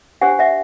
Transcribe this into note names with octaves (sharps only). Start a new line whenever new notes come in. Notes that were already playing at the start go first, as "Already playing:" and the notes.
D4 G4 C5 F#5 G#5
E5 F#5